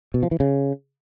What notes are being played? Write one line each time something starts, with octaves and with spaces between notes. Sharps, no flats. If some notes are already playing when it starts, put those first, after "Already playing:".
B2
F3
E3
C#3